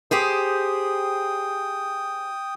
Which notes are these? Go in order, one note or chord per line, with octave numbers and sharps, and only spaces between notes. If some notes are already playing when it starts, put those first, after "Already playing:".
G4 G#4 C5 G5 D#6